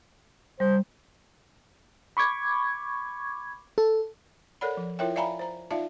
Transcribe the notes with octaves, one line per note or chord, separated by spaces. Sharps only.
G3 C5
B5 C#6 D6 G#6
A4
A4 A#4 C#5 D5 F#5 B5
F3
E4 F4 A#4 C#5 E5 G5
D5 E5 F5 G#5 A#5 B5
C5 A#5
D#4 F4 D5 E5 F5 A5